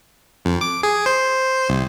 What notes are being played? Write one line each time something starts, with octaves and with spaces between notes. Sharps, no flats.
F2
D6
G#4
C5
C2